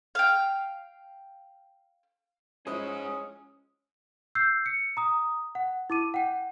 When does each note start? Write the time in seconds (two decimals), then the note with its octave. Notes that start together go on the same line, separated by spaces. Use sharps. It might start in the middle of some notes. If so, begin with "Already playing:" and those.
0.15 F5 G5
2.67 F3 G#3 C#4 E4 G#4 C5 D#6
4.35 E6 G6 C7
4.66 C#7
4.97 A#5 D#6
5.55 F#5
5.90 E4 D6 D#7
6.14 F#5 G5